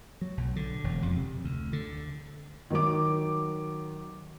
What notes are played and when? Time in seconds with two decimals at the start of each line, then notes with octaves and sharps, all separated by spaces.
0.21 F#3
0.37 B1
0.56 D3
0.84 E1
1.02 F2
1.16 C3
1.44 D2
1.73 D3
2.70 D#3 F#3 D6